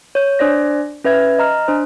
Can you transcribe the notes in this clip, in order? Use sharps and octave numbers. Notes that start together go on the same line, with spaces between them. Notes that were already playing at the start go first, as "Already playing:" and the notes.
C#5 G6
D4 C5 D5 A#6
C#4 B4 E5 G#6
D#5 A#5 F6
D4 C5